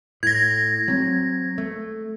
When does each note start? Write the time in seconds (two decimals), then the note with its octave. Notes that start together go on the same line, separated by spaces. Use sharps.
0.23 A2 G#6 A#6
0.88 F#3 C4
1.58 A3